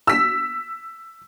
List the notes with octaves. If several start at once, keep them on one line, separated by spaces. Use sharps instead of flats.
E6 B6